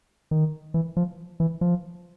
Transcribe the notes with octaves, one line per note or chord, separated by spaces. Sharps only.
D#3
E3
F3
E3
F3